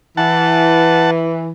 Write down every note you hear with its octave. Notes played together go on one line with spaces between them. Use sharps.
E3 F#5 A5